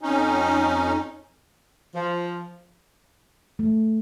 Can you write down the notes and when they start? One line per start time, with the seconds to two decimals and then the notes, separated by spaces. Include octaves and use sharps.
0.01 F2 C#4 D#4
1.95 F3
3.59 A3